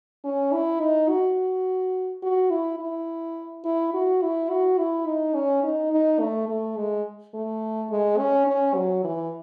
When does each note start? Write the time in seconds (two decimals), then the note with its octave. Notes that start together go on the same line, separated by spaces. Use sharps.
0.24 C#4
0.53 E4
0.80 D#4
1.09 F#4
2.22 F#4
2.51 E4
2.79 E4
3.64 E4
3.94 F#4
4.22 E4
4.50 F#4
4.78 E4
5.06 D#4
5.35 C#4
5.63 D#4
5.92 D#4
6.20 A3
6.48 A3
6.77 G#3
7.34 A3
7.90 G#3
8.18 C#4
8.47 C#4
8.75 F#3
9.04 E3